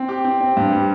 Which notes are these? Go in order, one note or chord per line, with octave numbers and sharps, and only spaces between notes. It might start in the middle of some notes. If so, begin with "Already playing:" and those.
Already playing: C4
G4
C4
C4
G2
G3